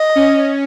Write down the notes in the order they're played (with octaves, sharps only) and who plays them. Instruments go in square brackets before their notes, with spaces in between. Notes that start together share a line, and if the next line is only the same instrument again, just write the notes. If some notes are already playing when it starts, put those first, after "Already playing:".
Already playing: [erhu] D#5
[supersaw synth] C#4